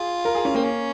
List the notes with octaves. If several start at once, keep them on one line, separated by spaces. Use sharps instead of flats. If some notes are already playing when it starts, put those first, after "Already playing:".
Already playing: F4 G#4
A#4
G#4
C#4
A#3 C4
C#4